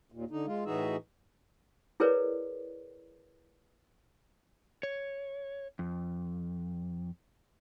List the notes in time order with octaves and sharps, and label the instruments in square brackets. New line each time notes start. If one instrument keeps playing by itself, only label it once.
[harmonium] D#2 A#2
D3 D#4
G#3 F4
A2 E3 D#4 F#4 G#4 E5
[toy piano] E4 G#4 A#4 B4 C#5 D5
[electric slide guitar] C#5
F2